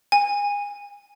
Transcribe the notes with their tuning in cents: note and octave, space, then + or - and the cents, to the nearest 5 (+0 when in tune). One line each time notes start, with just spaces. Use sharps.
G#5 -30